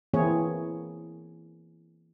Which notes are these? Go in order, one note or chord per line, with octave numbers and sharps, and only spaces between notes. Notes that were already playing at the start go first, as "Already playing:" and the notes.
E3 A#3 C4 E4 G#4 C#5